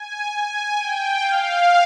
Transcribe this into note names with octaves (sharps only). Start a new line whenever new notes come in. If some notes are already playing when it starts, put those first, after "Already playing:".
Already playing: G#5
G#5
G5
F5